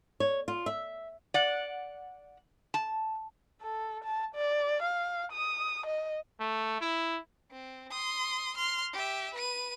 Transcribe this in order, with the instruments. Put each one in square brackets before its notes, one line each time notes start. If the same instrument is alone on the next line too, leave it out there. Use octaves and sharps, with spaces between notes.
[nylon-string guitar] C#5
F4
E5
[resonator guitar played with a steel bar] D5 F#5
A5
[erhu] A4
A5
D5
F5
D#6
D#5
[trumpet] A3
E4
[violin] C4
C6 D#6
C6 F6
G4 E5
B4 D#7